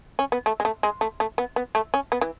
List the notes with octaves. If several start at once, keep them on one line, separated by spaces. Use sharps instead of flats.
C#4
B3
A3
G#3
A3
G#3
A3
A3
B3
B3
A3
C#4
B3
E3